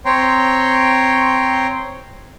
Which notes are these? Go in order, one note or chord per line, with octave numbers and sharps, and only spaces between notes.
C4 C#5 G5 A#5 C6